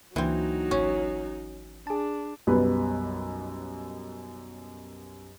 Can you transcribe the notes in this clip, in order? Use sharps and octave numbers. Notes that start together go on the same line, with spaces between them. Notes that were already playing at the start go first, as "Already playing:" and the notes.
C#2 E3 F#3 A#3 C4 D4 D#4
G#1 C#4
D4 G#4 A5
B1 F#2 B2 G3 B4